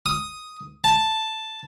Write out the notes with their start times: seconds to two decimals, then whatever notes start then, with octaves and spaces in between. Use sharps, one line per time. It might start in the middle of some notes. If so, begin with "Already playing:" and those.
0.06 D#6
0.84 A5